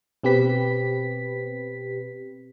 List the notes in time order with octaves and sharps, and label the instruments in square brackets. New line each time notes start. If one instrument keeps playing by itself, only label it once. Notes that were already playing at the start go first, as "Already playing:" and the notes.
[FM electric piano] B2 C4 G4 B4 B6